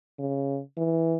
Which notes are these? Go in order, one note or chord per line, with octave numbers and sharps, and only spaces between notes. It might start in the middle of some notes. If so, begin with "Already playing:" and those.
C#3
E3